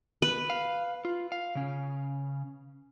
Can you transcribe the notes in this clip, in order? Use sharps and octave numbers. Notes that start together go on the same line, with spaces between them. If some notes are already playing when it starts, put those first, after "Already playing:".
B4
F5
F4
F5
C#3 C#4